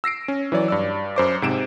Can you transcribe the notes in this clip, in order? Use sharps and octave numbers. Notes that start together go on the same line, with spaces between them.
E6 A#6 C7 D7
C#4
E3 F#3 C#5 D5
G2 D5 E6
F#2 C5 D6
G#2 C3 D7 E7